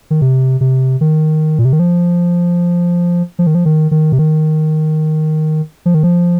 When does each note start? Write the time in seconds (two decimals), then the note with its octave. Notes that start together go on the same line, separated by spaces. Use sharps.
0.11 D#3
0.21 C3
0.61 C3
1.01 D#3
1.59 A#2
1.65 C3
1.73 D#3
1.79 F3
3.39 F3
3.47 D#3
3.55 F3
3.65 D#3
3.91 D#3
4.12 C3
4.18 D#3
5.86 F3
5.94 D#3
6.03 F3